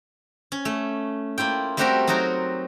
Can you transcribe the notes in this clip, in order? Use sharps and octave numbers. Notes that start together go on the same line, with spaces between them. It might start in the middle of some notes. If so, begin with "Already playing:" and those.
C#4
A3
A#3 E4 F4 G5
G3 A3 C4 F#4 G4 A#4
F#3 C4 D#4 F#4 A#4